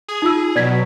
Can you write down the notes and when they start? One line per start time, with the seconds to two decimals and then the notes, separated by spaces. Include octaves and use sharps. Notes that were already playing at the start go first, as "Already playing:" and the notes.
0.08 G#4
0.22 D#4 F4 E6
0.55 B2 F#3 D5 G#6 B6